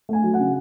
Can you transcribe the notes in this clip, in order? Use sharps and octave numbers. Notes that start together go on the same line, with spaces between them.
A3 G#5
F#3
F#5
C#3